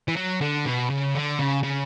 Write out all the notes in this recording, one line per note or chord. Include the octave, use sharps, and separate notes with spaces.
E3
F#3
D3
B2
C#3
D3
C#3
C#3